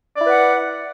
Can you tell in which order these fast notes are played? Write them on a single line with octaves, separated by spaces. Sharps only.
D5 E4 B4 F#5